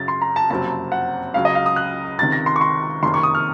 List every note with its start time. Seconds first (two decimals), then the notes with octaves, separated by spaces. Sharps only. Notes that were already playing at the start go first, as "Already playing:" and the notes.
Already playing: F#2 C#3 F#3 A6
0.08 C6
0.21 A#5
0.36 A5
0.50 F#1 F2 C3 F#3 C4 A5
0.92 F#5
1.34 C#2 C#3 F#3 F5
1.45 D#5
1.55 F5
1.66 D#6
1.76 F#6
2.18 C#2 C3 D#3 A6
2.32 A#6
2.46 C6
2.56 C#6
2.61 C6
3.03 F#1 F2 C3 D#3 C6
3.14 C#6
3.23 D#6
3.35 F6